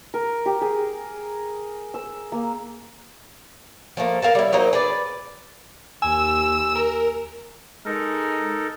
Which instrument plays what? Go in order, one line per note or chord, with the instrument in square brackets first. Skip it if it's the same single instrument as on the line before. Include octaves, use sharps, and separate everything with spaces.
[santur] A#4
G4
G#4
E6
A#3
[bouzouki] F3 A3 A#3
A#4 F5 G#5 A5
G3 E4
F#3 A#3 D#4 C5
G#4 B4 D5
[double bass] D#2 [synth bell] G#5 [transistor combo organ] E6
[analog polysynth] A#4
[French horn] G#3 [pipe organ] D#4 A4 A#4